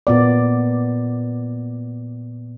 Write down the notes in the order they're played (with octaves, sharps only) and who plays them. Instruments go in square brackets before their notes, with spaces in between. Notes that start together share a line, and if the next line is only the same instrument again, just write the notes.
[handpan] A#2 B3 D5